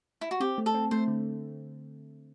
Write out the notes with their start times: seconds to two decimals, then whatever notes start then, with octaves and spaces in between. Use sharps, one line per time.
0.21 E4
0.31 F#4
0.40 C4 G4
0.58 A3
0.66 A4
0.74 C4
0.91 A3 C5
1.08 D3